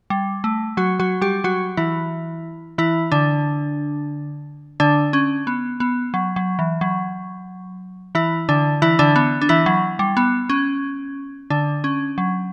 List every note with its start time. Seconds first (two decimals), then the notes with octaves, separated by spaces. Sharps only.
0.10 G3
0.44 A3
0.77 F#3 F#4
1.00 F#3 F#4
1.21 G3 G4
1.44 F#3 F#4
1.77 E3 E4
2.78 E3 E4
3.12 D3 D4
4.80 D3 D4
5.13 C#4
5.47 B3
5.80 B3
6.14 F#3
6.36 F#3
6.59 E3
6.81 F#3
8.15 E3 E4
8.49 D3 D4
8.82 E3 E4
8.99 D3 D4
9.16 B3
9.42 D4
9.49 E3 E4
9.66 F#3
9.99 G3
10.17 B3
10.49 C#4
11.50 D3 D4
11.84 C#4
12.18 F#3